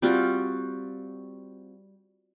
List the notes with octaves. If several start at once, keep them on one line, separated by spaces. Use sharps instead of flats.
G3 C4 F4 F#4